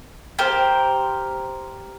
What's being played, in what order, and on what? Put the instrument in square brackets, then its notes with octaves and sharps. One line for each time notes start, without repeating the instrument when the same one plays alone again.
[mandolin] G4 A#4 C5